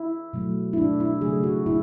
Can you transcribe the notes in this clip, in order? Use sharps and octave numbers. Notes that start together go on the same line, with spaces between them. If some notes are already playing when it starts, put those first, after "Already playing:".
Already playing: E4
B2 F#3 A3
E4
B2 A3 D4
E4
C#3 F#3 A3 G#4
F#4
B2 E4